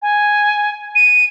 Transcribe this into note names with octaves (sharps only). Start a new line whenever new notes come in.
G#5
D#7